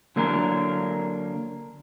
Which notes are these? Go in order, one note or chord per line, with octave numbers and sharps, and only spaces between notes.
D3 F#3 A#3 D4 A#4